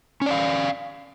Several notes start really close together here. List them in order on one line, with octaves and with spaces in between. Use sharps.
C#4 D5 F5